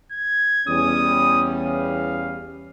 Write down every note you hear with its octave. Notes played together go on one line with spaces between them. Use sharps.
G#6
E2 G3 C#4 D#6
F5